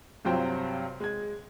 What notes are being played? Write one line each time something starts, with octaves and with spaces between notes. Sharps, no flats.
G2 C3 F#3 F4 C5 G5
G#3 G#6